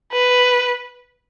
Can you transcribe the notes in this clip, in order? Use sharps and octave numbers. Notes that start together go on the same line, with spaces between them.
B4